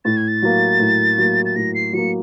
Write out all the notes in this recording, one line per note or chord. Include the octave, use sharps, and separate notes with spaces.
A2 A6
G#6
A6
F#3 A#3
A2
F#3 A#3
A6
A2 A#6
C7
F#3 A#3 C#7